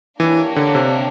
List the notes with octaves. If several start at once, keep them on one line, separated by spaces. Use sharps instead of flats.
E3 A#3 D4 G4 A#4 C#5
D3
C3